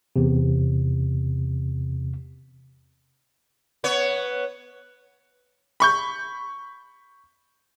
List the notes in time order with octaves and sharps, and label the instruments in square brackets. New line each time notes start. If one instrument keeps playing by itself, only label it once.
[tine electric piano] E2 C3
[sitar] B3 C#5
[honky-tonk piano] B5 C#6 G6